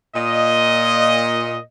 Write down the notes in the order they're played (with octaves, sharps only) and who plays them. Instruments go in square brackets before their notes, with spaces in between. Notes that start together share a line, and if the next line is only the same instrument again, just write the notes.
[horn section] A#2 D#5